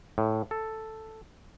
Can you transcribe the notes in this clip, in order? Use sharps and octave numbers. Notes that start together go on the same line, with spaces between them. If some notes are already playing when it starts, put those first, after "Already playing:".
A2
A4